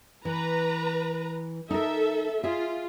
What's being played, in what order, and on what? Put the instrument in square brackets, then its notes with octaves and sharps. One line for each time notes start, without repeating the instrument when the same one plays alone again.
[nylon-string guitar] E3 [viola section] B4 A#5
[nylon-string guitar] D#4 A#4 [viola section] A4 E5
[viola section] F4 [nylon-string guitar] G#4 E5